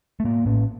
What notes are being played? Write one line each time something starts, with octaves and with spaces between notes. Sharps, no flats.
A3
A2 A#3
A2 C#4